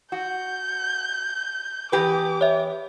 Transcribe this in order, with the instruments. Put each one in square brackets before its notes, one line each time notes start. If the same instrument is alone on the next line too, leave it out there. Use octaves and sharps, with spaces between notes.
[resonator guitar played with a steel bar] F#4 [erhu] G6
[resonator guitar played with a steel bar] E2 G4 B4 [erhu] D6
[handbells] C#5 E5